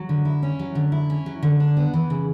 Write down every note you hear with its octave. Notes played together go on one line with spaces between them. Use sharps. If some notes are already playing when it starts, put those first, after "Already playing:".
Already playing: F#3
D3
E4
C#4
F#3
D3
E4
C#4
F#3
D3
D4
B3
E3
C#3